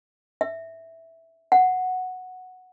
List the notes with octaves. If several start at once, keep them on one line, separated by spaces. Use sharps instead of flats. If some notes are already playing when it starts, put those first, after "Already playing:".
E5
F#5